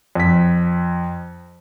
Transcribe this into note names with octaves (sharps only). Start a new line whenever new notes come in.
F2 B6